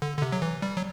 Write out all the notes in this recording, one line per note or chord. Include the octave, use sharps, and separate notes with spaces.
D3
D3
C3
F#3
E3
G3
F#3